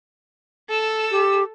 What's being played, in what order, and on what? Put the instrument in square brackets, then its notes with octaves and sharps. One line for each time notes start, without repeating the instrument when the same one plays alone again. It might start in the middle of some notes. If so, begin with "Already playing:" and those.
[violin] A4 E6
[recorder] G4